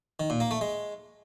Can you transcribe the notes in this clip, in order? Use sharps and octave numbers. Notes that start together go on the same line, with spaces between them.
D#3
A#2
A#3
A3
G#3